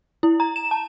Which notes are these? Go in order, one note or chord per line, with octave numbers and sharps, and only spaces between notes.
E4
A#5
E7
A5